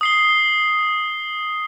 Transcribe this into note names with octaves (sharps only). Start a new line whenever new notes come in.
D#6 C7 G7